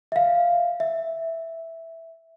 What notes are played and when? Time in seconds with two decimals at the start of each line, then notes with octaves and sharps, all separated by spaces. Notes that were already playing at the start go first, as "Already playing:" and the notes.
0.12 E5 F5
0.80 E5